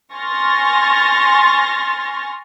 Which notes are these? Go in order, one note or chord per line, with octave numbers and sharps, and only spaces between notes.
G#5 C6 C#6 F6 A6 A#6